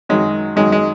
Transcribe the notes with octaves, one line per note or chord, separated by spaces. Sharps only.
F#2 D#3 F#3 G#3
F#2 D#3 F#3 G#3
G#3